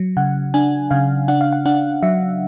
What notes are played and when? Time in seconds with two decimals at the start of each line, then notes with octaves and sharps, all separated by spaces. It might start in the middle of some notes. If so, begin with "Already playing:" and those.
Already playing: F#3
0.17 C#3 F#5
0.54 D4 G#5
0.91 C#3 F5
1.28 D4 F#5
1.41 F5
1.53 F#5
1.65 D4 F#5
2.02 F#3 E5